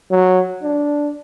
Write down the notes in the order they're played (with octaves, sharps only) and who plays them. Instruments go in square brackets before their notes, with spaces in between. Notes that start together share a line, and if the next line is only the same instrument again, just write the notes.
[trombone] F#3
D4